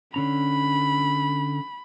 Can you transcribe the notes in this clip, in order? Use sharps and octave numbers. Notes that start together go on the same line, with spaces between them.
D3 C#4 A#5 B5